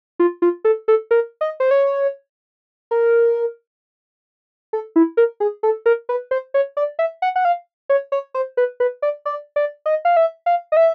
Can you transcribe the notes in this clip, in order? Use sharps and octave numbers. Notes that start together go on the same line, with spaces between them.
F4
F4
A4
A4
A#4
D#5
C5
C#5
A#4
A4
E4
A#4
G#4
A4
A#4
B4
C5
C#5
D5
E5
F#5
F#5
F5
C#5
C#5
C5
B4
B4
D5
D5
D5
D#5
F5
E5
F5
D#5
E5